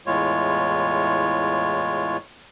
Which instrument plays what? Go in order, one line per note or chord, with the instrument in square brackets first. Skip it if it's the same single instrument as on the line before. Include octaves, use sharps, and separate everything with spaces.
[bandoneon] E2 A2 G#3 F4 C#5